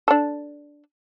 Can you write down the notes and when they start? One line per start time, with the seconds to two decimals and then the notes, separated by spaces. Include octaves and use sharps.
0.08 D4 A4